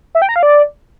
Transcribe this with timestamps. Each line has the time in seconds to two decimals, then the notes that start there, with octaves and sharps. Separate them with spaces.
0.15 E5
0.22 G5
0.29 A#5
0.36 F5
0.43 D5